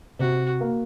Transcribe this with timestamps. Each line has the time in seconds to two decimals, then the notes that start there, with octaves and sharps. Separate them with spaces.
0.19 C3 F#4
0.61 A#3